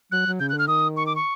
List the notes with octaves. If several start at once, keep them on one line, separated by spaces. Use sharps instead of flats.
F#3 F#6
F#3
C#3 G6
F#6
D3
F6
D#3 D#6
C#6
D6
C#6